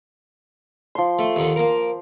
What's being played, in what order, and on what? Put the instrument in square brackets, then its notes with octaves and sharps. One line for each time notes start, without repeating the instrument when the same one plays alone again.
[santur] F3 C6
[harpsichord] A3
D#2 D3
A#3 A#4